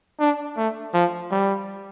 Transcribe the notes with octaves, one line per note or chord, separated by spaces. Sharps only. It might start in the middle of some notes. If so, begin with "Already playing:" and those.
D4
A3
F3
G3